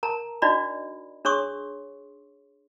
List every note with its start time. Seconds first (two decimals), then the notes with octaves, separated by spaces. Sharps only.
0.03 A#4 A5 A#5
0.42 D4 D#4 F#4 D5 D#5 B5
1.25 D4 G#4 C#5 C6 C#6 D#6